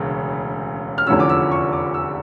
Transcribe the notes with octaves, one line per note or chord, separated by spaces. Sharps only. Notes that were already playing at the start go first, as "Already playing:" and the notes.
Already playing: E1 D2 C#3
F6
F1 E2 D3 F3 C#4 E6
D6
E6
C#6
D6
E6